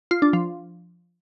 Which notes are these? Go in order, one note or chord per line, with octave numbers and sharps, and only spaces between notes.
F4
D4
F3